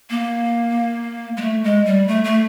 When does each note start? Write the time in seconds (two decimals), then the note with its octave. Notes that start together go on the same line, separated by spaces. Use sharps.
0.10 A#3
1.37 G#3
1.41 A3
1.64 G#3
1.86 G3
2.08 A3
2.24 A3